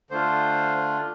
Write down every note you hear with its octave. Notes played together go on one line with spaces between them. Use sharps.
D3 A3 D4 F4 C5